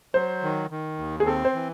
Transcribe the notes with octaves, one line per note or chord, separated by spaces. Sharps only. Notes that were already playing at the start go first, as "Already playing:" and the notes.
F#3 C5
D#3
D#3
D#2
G#4
C4 A4
C5
E3